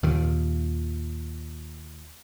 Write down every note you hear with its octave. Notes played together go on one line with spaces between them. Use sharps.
D#2 A#2 D#3